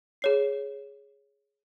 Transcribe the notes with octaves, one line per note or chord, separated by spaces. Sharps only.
G#4 C#5 C7